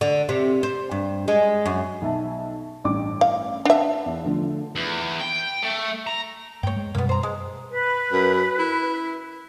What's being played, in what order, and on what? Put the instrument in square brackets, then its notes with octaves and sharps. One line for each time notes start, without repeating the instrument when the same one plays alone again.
[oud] D3
C3
C5
G2
G#3
F#2
[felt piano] B1 E5 A5
A1 G2 D6
[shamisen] F5
[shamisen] D4 E5 [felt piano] B4 F#5 A5
[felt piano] E2
D3 F3 A3
[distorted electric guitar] E2
G5
A3
A#5
[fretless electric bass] G2 A3 [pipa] C#5 G5
[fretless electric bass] G#3
[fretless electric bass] F#2 B2 G3 [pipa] A#3 B3
[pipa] C5 A#5
G#3
[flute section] B4
[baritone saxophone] F#2
E4